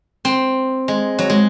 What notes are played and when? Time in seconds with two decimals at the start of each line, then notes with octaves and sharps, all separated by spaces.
0.25 C4
0.88 G#3
1.19 F#3
1.30 G#3